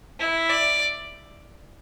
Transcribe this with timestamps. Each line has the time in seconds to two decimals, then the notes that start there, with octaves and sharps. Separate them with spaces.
0.20 E4
0.50 D5